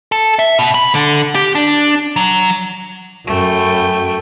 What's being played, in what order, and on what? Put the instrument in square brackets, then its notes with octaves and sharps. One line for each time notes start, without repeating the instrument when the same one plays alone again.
[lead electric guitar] A4
E5
B2
B5
D3
G4
D4
F#3
[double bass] F#2 [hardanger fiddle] A3 G5